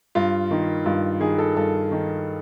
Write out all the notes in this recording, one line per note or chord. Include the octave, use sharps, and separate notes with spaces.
G2 F4
D#3
G2 F4
D#3 G#4
A4
G2 A4
D#3